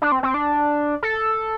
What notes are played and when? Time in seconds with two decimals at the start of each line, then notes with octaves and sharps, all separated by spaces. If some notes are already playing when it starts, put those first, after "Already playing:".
0.02 D4
0.12 C4
0.23 C4
0.34 D4
1.03 A4